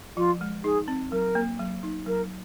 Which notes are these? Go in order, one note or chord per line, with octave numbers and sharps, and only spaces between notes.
F3 F4
G#3
D#4 G#4
C4
F#3 A#4
A#3
F#3
D#4
F#3 A#4